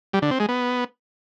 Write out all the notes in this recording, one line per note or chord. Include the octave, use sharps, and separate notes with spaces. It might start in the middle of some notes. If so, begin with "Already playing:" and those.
G3
D3
C4
G#3
B3